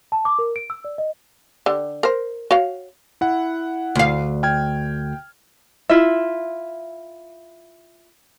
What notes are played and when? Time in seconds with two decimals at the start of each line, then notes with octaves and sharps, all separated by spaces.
0.12 A5
0.25 D6
0.39 A#4
0.56 D7
0.70 E6
0.85 D5
0.98 D#5
1.66 D3 G4
2.03 A#4 C5
2.51 F#4 C#5 F5
3.21 E4 F#5
3.95 D2 F5
4.43 G5 F6 G#6
5.90 E4 F4 E5